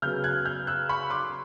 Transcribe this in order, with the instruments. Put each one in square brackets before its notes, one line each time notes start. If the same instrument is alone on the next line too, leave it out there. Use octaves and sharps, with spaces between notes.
[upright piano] C#3 F#3 B3 F6 G6
F#6 G#6
F6 G6
E6 F#6
B5 C#6
C6 D6